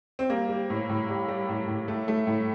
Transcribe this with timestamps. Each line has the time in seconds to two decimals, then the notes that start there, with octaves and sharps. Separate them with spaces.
0.19 C4
0.30 G3 A#3
0.49 G3
0.70 A2
0.89 A2
1.08 G3
1.28 G3
1.49 A2
1.67 A2
1.88 A3
2.08 A3
2.27 A2